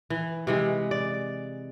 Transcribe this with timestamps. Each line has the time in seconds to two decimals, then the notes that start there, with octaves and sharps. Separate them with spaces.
0.10 E3
0.47 C3 E3 G#3
0.91 D5